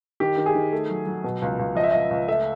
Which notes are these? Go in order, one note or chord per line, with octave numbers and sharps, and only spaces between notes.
D#3 G4
D#3
G#4
D#3
A3
F#3
F#3
B2
C#2
C#2
F3 D#5
E5
C#2 D#5
C#2
A3 E5